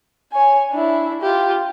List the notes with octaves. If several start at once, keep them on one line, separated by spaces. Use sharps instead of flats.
C#5 G#5
D4 E4
F4 G4